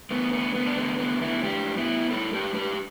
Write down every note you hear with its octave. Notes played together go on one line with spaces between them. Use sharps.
E2 D3 A3 B3
B3
B3
D4
E2 D3 A3 B3
B3
B3 E4
A2 G3 D4 G4
B3 E4
A2 G3 E4 A4
G4 B4
G4 B4